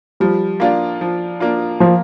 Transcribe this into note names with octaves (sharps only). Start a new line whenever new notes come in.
F3 G3
A#3 D4 F4
F3
A#3 D4 F4
F3 A#3